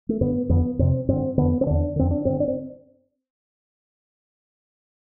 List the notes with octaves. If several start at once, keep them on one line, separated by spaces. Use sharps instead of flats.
A3
G2 D3 B3
F2 D3 B3
F2 C3 C4
G2 D3 C4
F2 D3 B3
C4
E2 D3 D4
F2 D3 C4
D4
G2 D3 C4
D4
C4